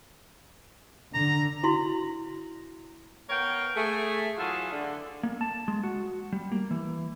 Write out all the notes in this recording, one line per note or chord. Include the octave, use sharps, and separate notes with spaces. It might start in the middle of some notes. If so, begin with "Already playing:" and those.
D3 A#5
E4 F#4 C6
A#3 B3 A#4 C#5 G5
A3 G#4
E3 F#3 F4 F#4 G#4 A4
D3
A#3
A5
G#3
F#4
G3
A#3
E3